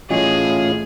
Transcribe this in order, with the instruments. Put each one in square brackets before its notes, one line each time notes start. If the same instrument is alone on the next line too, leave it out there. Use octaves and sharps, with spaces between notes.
[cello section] A2 [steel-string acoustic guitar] E3 C#5 D#5 [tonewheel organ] C#4 F4 [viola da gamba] G#4